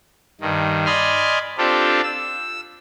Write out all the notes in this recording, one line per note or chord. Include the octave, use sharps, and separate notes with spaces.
G2 D#3
D5 D#5 G#5 B5 C6 F6
C4 D4 F4 G4 A4
E6